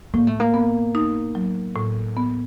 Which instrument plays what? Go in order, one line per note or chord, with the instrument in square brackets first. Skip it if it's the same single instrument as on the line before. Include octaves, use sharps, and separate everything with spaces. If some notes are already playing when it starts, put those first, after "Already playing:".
[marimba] A2 [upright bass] A#3
[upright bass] A3
A#3
[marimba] B3
D#4
F#3
A2
B3